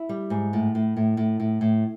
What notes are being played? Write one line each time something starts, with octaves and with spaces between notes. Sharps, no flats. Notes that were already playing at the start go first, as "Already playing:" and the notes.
Already playing: E4
G3
G#2
A2
A2
A2
A2
A2
A2